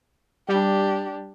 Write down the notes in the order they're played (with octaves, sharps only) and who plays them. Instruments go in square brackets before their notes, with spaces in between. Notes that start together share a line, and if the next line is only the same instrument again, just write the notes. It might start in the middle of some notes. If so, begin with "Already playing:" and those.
[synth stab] G3 [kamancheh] D4 G4